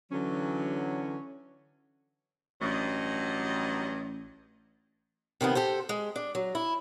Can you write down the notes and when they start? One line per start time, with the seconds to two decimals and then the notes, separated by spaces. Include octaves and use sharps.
0.12 D3 E3 F#3 C#4
2.61 A1 G2 F#3 D#5
5.41 C3 D#3 F3 B3
5.55 G4 A4 C5
5.89 G#3
6.16 D4
6.35 F#3
6.55 E4